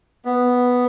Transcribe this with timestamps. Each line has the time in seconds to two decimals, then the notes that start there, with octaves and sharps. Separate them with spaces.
0.25 B3